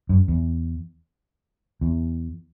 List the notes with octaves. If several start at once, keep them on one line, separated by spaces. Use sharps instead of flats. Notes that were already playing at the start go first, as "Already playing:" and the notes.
F#2
E2
E2